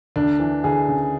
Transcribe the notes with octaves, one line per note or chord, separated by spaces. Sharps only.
D2 D4
E3
D2 G#4
C#3